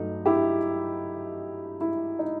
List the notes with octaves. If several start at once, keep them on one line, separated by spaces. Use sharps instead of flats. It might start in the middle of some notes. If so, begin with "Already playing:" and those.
Already playing: G2 F#3 A3 D#4
E4 G4
E4
D#4